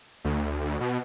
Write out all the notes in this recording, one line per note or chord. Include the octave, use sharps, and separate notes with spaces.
D2
D2
B2